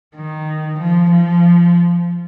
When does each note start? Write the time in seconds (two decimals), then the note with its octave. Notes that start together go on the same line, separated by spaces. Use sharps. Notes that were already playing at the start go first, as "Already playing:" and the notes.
0.16 D#3
0.79 F3
1.11 F3